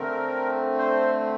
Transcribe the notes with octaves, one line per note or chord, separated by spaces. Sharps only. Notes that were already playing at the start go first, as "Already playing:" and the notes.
Already playing: D3 A3 C4 A#4
C5